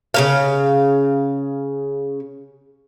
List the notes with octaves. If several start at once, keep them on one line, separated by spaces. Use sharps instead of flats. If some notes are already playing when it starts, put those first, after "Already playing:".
C#3 A#3 F5